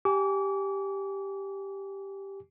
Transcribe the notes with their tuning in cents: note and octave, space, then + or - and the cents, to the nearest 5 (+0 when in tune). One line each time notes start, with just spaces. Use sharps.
G4 +0 G#5 +0 D6 -35